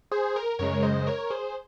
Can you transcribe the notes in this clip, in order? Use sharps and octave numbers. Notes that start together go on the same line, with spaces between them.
G#4 C5
A#4
F#2 C#3 G#3 A#4 C#5
C5 D#5
A#4 C#5
G#4 C5